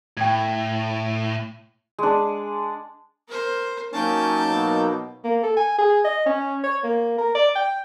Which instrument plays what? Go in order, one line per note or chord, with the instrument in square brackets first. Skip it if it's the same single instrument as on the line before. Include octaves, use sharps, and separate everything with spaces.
[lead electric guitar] A2 [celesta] G5 G#6
[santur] G#3 D4
[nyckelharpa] A#4 C5
[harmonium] F#3 A#3 D#4 [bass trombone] C#4 [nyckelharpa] G5 A5
[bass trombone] B2
[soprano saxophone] A#3
A4
G#5
G#4
D#5
C#4
C#5
A#3
A#4
D5
G5